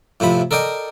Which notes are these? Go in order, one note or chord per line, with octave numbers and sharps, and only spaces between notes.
A2 C3 F3 B5
A4 A#4 D5 D#5 G5